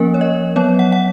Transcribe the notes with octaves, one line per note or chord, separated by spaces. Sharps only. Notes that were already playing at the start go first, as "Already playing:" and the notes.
Already playing: F3 A#3 C#4 A#4
C#5
D#5
F#3 B3 C#5
F#5
F#5